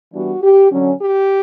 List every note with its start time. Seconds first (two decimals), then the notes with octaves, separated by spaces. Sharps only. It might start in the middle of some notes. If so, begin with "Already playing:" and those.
0.12 E3 G3 B3 D4 F#4
0.42 G4
0.71 D3 F#3 C#4
1.00 G4